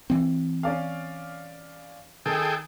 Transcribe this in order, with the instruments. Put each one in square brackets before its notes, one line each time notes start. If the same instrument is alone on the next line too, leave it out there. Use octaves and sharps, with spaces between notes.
[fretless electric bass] E3 C4
[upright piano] C#4 D5 F5
[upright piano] D#3 [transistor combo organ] G#4 A4 G5